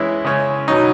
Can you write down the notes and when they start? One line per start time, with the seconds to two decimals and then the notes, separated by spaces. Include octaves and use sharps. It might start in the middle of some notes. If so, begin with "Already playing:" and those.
Already playing: E3 G#3 C#4 E4
0.24 C#3 G#3 C#4
0.68 B2 F#3 C#4 D#4